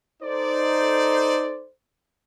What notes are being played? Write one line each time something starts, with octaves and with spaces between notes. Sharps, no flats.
D#4 A4 C5 D5